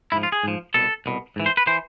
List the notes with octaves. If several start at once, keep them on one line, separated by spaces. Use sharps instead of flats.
G#2 F3 E4
F4
G#4
G#2 F3
C2 B2 A4
C2 B2
G#2 E3
C5
B4
E3 C5